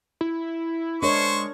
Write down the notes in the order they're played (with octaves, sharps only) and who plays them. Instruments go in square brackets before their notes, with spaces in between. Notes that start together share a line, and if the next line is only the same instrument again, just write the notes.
[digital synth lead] E4
[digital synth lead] G#3 [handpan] D4 A#4 C#5 [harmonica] C5 C#6